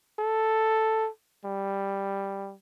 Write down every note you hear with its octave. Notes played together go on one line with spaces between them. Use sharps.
A4
G3